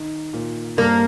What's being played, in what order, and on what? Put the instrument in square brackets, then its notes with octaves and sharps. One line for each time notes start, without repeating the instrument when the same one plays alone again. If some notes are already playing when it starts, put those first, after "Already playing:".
Already playing: [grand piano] D#3 D#4
A#2 A#3
[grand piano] G2 G3 [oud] A#3